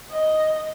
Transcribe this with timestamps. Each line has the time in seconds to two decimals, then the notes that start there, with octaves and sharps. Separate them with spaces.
0.11 D#5